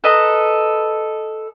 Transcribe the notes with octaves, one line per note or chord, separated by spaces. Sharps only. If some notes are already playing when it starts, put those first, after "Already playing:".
A4 B4 D#5 A#5